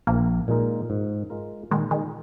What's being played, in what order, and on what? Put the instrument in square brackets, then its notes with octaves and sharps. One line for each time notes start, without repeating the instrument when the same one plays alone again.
[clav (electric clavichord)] A#1 [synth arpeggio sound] F3 A#3
[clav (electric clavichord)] A#2 G#3 D#4 A#4
G#2
G#3 F4 A#4
[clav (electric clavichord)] A#2 [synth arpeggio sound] D#3 G#3
[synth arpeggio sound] D#3 G#3